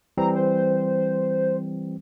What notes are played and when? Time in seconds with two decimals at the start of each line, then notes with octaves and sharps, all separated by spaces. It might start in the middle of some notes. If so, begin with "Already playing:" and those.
0.17 E3 G3 C4 A#5
0.35 C5